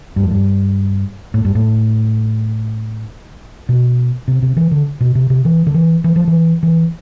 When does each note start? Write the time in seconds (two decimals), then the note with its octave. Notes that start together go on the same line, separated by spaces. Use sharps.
0.16 G2
0.23 F2
0.31 G2
1.34 A2
1.45 G2
1.55 A2
3.69 B2
4.28 C3
4.43 C3
4.57 E3
4.71 D3
5.01 B2
5.15 C3
5.30 C3
5.45 E3
5.67 D3
5.74 E3
6.04 E3
6.16 F3
6.28 E3
6.63 E3